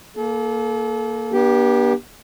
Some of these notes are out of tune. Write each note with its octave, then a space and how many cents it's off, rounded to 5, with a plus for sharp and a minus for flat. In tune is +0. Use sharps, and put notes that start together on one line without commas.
A#3 +0 A4 -35
B3 -45 D4 +5 G4 +0